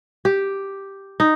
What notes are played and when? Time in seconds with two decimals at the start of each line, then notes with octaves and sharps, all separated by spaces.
0.25 G4
1.20 D#4